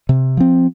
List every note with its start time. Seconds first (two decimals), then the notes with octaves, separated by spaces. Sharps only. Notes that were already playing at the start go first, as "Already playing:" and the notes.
0.09 C3
0.37 F3 C4